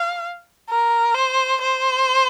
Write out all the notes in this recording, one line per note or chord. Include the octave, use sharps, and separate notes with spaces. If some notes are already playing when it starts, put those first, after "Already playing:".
Already playing: F5
A#4
C5
C5